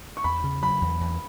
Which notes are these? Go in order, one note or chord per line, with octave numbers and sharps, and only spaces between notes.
C#6
E2 B5
C#3
F#3 B5
E2
E2